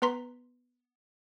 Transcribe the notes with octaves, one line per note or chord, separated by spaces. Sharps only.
B3 B4 A#5 C6 B6